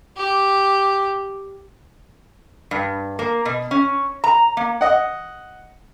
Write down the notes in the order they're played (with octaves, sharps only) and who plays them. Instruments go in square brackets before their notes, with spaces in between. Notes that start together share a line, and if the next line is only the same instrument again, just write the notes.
[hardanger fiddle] G4
[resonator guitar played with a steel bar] G2
A#3
B2
C#4
A#5
A#3
[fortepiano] D#5 F#5